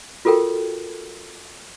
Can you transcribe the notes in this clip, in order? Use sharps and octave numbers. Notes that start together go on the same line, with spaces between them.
F4 F#4 A4 A#4 G5